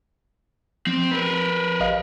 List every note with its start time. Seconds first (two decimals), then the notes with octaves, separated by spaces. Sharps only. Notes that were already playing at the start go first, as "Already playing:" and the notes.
0.87 F3 C4
1.11 A#4 B4
1.80 A1 D#5 F5